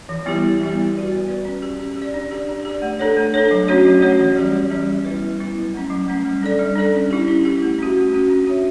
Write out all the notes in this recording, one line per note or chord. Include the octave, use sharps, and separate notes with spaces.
E3
G3 B3 E4 G4
E3
G3 B3 E4 G4
B3
F#4 B4 D5
B3
F#4 B4 D5
C#4
G4 D5
C#4
G4
D5
D4
G4 D5
D4
G4 D5
A3
D4 A4 C#5
A3
D4 A4 C#5
F#3
A3 C#4 F#4 C#5
F#3
A3 C#4 F#4 C#5
E3
G3 C#4 G4 D5
E3
G3 C#4 G4 D5
G3
B3 E4 B4
G3
B3 E4 B4
F#3
A3 C#4
F#3
A3 C#4
G3
D4 A4 D5
G3
D4 A4 D5
C#4
E4 G4
C#4
E4 G4
A3
C#4 F#4
A3
C#4 F#4
D4
F#4 C#5 E5